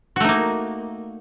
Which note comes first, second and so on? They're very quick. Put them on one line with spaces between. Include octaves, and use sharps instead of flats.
F#4 A3 D#4 A#3